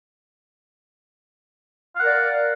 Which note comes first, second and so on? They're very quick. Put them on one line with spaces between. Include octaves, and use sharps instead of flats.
F5 F#5 A#4 D5